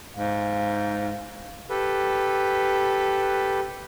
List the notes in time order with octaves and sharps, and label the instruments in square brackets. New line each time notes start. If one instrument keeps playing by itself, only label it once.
[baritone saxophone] G#2 [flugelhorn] F5
[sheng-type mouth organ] G4 A4 B4